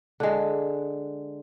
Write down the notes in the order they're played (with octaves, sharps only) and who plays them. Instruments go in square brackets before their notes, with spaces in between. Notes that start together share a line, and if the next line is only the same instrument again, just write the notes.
[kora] D3 G#3